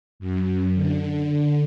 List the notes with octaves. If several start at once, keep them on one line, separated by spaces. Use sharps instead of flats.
F#2
D3